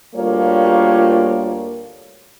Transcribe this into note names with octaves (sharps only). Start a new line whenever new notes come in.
D2 G3 A#3 F4 C#5